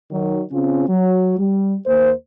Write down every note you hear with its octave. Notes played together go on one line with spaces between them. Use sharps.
D#3 F#3
C#3 C4 C#4 F4
F#3
G3
D#2 A#3 C5